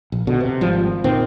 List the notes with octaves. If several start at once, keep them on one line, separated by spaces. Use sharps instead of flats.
A#1
B2 D3
C3
G#1 F3 G3
A#2 D#3 C4